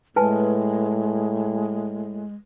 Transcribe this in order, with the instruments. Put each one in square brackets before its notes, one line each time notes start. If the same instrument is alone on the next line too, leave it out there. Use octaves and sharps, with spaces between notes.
[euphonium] A2 [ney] G#3 [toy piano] B4 G#5 A5